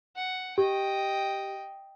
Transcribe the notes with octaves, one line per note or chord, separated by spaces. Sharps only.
F#5
G4 D#5 G5